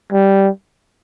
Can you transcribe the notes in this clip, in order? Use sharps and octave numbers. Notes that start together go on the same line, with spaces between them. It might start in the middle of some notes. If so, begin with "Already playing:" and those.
G3